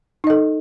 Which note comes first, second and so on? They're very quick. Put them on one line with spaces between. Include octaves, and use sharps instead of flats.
D#4 D#5 A4